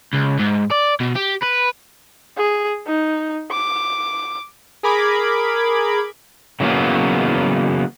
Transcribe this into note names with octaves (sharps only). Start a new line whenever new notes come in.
C#2
G#2
D5
B2
G4
B4
G#4
D#4
D6
G#4 A#4 B5 D6 G#6
C#3 E3 F#3 A#3 B3